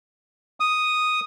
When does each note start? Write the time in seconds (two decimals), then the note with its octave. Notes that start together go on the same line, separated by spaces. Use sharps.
0.60 D#6